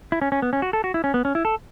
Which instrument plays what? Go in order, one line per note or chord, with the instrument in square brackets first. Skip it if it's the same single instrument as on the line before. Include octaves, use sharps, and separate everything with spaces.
[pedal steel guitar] E4
C#4
C#4
B3
C#4
F#4
A4
F#4
E4
C#4
B3
C#4
E4
A4